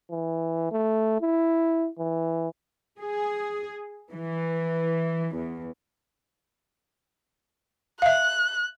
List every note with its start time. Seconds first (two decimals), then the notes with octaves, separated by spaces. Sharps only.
0.11 E3
0.71 A3
1.21 E4
1.99 E3
3.00 G#4
4.12 E3
5.36 E2
8.02 E5 F5 F#6